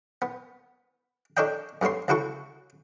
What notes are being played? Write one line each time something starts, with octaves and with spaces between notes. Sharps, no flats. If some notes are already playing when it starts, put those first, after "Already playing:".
B3
D4 A4 C#5 D#5 G5
G2 A3 B3 C#5 C6
C#2 C#3 E4 F#4 A4 C#6